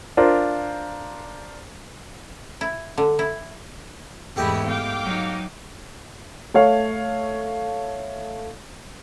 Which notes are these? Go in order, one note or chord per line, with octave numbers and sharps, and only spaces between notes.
D4 F4 A#4 C5
E4
D3
E4
E2 G#2 A3 B3 E4 G4 D#5 B5
F5 G5 D6
F#3 D#4
A3 C#5 F5